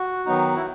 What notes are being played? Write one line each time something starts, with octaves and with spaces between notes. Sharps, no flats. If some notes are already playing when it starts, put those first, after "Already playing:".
Already playing: F#4
D#3 F#3 B3 D#4
E4